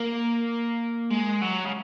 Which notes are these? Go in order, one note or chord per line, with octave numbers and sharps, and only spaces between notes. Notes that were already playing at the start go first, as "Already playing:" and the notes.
Already playing: A#3
G#3
F#3
C#3